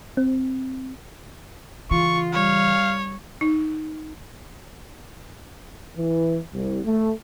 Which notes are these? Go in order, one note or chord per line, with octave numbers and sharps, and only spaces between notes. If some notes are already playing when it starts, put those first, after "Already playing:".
C4
C#3 E3 F4 C#6
G3 C#5 F5
D#4
E3
C2
A3